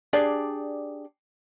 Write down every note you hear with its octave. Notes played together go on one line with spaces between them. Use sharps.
D4 G4 G#4 D5